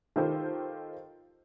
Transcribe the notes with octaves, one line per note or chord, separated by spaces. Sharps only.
D#3 F4 G4 A4 C5